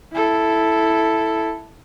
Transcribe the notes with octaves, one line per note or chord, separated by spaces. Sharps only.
E4 A4